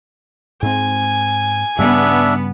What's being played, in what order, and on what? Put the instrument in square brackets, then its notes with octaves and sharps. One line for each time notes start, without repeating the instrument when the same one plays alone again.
[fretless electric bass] G#2 C4 [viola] G#5
[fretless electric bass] G2 C#3 G3 [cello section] B3 [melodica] D4 E5